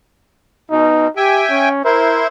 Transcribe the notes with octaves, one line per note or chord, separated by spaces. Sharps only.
B2 D#4
G4 E5 G5 G#5
C#4
E4 A#4 C5